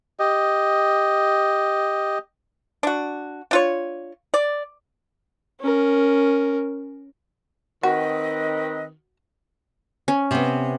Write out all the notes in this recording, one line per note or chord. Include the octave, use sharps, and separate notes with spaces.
G4 D#5
D4 F#4
D4 F4 C#5
D5
C#4 A#4
D#3 C4 F#4 B4 D#5
C#4
C3 B3